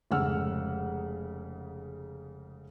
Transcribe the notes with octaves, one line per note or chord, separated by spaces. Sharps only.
F1 G#2 C#3 F#5 E6 F6